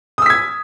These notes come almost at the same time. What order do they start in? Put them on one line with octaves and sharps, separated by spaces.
D#6 E6 B6 G#6